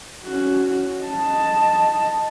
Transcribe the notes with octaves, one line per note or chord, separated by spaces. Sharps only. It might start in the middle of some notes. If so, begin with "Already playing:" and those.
C#4 F#4
D#5 A5